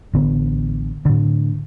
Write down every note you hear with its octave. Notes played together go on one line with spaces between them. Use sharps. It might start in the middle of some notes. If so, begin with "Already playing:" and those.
A1 D3 B3
A2 D3